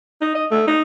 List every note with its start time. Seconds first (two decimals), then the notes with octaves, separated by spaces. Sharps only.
0.22 D#4
0.35 D#5
0.51 A3
0.67 D#4